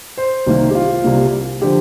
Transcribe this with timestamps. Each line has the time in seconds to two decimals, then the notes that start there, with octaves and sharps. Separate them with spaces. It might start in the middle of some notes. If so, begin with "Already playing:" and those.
0.17 C5
0.46 C2 C3 D#3 A#3
0.71 G4
0.75 F4
1.04 C2 C3 G3 A#3
1.62 D3 F3 G4